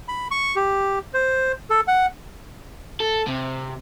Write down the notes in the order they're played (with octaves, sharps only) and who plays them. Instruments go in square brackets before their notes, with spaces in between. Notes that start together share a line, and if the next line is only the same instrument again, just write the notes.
[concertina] B5
C#6
G4
C5
A4
F#5
[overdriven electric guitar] A4
C3